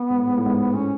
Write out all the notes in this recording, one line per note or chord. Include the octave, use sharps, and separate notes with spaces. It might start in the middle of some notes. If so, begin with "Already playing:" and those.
Already playing: B3
G#2
A2
G#2
A2
G#2
A2 C#4